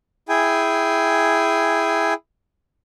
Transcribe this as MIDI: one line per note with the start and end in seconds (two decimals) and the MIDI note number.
0.29 2.14 64
0.29 2.14 68
0.29 2.14 79
0.29 2.14 80